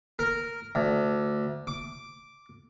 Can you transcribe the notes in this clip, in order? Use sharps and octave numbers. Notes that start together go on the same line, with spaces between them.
A#4
D2
D6